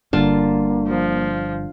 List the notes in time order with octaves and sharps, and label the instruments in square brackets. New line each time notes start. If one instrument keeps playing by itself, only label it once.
[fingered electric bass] G1 G2 [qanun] D3 F4 A5 [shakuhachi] A#3
[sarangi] F3